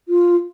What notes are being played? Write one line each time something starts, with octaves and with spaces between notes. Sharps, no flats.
F4